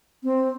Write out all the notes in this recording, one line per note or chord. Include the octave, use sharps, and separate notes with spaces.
C4